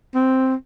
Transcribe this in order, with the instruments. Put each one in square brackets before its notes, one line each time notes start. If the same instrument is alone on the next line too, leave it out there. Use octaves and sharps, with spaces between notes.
[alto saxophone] C4